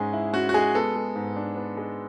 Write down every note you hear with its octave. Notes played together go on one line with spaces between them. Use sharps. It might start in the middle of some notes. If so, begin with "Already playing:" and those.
Already playing: G#2 G#3 C#4 G#4
E4
C#4 F#4
F#4
G#3 G#4
B3 A4
G#3
G#2
D4
B3
G#3